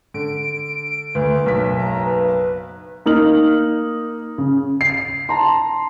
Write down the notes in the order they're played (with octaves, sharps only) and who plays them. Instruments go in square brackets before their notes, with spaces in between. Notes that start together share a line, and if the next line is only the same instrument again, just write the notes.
[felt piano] D3 [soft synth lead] D7
[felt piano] D2 [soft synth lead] B4
[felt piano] F#1 B1 B6
[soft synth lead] A#5
B4
[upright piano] A#3 D#4 F6 F#7
C#3
C7
A5 A#5 C6